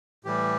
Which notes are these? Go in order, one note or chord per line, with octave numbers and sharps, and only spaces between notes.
A2 E3 G3 G4